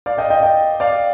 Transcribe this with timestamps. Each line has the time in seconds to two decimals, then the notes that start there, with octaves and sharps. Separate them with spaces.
0.06 D5 F5
0.18 D#5 G5
0.30 D#5 G5
0.43 D#5 G5
0.80 D5 F5